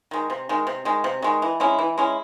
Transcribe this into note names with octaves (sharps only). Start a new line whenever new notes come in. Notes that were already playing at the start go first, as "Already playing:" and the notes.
D#3 G#3
C3
D#3 G#3
C3
D#3 G#3
C3
D#3 G#3
E3
G#3 C#4 E4
E3
G#3 C#4 E4